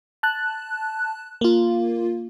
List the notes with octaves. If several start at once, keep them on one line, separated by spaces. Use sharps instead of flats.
A5 F#6
A#3 F4